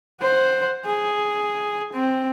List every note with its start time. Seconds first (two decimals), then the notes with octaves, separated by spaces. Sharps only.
0.22 C5 F#5
0.86 G#4
1.93 C4